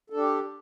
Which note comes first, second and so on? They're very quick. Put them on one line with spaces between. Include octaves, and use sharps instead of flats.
A4 D4 G4